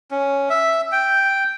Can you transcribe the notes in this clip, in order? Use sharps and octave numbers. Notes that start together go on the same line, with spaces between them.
C#4
E5
G5